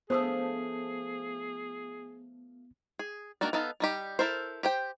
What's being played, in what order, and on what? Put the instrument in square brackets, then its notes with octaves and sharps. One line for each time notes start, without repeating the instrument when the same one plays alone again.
[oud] F3 A3 D4 [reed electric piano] B3 [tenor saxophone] G#4 [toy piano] C5 D#6 E6
[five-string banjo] G#4
D#3 A#3 D4 F#4 D5
B3 D#4 A4 F5
G3 D#4 G4
E4 A4 A#4 C5
G4 C5 G5